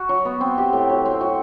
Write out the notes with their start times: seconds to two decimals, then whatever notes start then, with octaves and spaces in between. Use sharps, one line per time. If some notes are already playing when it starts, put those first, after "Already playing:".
Already playing: F#4
0.09 F#3
0.25 B3
0.41 C4
0.58 G4
0.73 A2
0.90 F#3
1.05 C4
1.21 F#4